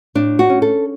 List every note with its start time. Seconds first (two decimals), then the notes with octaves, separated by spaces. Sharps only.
0.15 A2 D4
0.39 F#4
0.50 C#4
0.62 A4